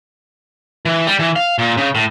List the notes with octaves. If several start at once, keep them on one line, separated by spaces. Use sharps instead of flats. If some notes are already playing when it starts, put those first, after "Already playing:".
E3
G3
E3
F5
A#2
C#3
A2